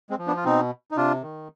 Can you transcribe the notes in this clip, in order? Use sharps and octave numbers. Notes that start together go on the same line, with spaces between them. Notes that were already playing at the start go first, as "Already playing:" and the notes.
G#3 C4
F3
B3 D4
F4
B2 C4 D#4
D#4
C3 D4 F4
D#3